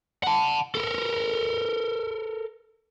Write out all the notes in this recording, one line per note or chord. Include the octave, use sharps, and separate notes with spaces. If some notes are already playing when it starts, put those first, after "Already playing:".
F#5 A5
A4 A#4